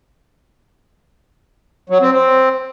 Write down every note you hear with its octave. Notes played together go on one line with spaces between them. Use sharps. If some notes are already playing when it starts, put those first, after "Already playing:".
F#3
C4
C4